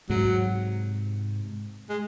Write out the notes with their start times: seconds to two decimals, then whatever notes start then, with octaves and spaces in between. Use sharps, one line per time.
0.09 G#2 C3 F#3
1.89 G#3